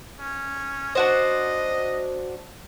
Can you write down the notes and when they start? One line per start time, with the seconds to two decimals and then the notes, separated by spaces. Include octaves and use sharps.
0.20 C#4
0.95 D4 F#4 C5 D#5